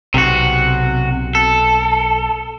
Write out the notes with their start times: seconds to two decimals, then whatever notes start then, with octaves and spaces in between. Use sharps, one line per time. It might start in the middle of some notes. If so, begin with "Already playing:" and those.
0.14 B1 C3 F#4
1.35 A4